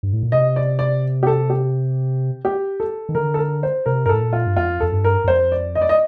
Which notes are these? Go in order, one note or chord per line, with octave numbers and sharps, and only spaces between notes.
G2
A2
A#2
C3 D#5
D5
D5
G4
A4
G4
G4
A4
D#3
D3 A#4
A4
A#4
C5
C3 A#4
G2 A#4
A2 A4
A#2
F4
G2
F2 F4
F2 A4
G2
A#4
G2
F2 C5
D5
D#5
D5
D#5